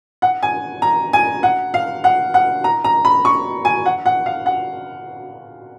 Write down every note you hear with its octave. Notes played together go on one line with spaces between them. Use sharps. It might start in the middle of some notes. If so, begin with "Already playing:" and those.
F#5
G#5
A#5
G#5
F#5
F5
F#5
F#5
A#5
A#5
B5
C#6
G#5
F#5
F#5
F5
F#5